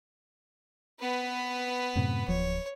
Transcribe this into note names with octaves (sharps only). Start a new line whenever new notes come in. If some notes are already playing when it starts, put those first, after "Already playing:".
B3 B4
F#2 A2 C3
D1 F3 C#5